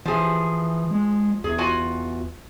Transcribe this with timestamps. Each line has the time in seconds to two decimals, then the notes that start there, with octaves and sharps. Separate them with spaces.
0.06 E3 F3 G#4
0.91 G#3
1.44 E2 G#4
1.58 F4 F#4 G#5